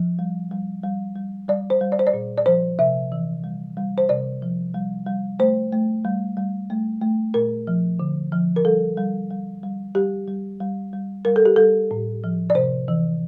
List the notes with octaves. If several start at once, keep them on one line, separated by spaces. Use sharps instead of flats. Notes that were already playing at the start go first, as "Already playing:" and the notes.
Already playing: F3
G3
G3
G3
G3
G3 D5
C5
G3
D5
C5
D5
A#2
D5
F3 C5
C3 E5
E3
G3
G3
C5
C3 D5
F3
G3
G3
A3 C5
A3
G3
G3
A3
A3
A#2 A#4
F3
D3
F3
A#4
G3 A4
G3
G3
G3
G3 G4
G3
G3
G3
G3 A#4
A4
G4
G3 A4
A2
F3
D5
C3 C5
E3